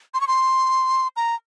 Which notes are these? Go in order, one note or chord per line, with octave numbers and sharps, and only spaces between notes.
C6
C#6
C6
A#5